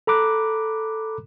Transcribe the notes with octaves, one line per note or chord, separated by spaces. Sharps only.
A4 A#5 B5 D6 F#6